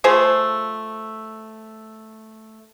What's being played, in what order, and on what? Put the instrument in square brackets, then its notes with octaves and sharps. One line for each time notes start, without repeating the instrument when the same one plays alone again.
[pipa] F3 A3 G#4 C5